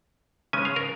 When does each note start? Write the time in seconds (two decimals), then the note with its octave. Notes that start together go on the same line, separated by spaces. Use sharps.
0.53 C#3 G#3 C#4 G#5
0.65 F5
0.76 A#4